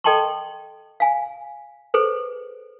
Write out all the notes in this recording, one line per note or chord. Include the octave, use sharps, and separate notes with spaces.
A4 D#5 G5 A5 C6 C#6
F5 G#5
G#4 A4 B4 C5